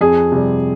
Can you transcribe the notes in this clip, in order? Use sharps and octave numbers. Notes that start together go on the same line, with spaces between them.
F2 G#4
C3 G3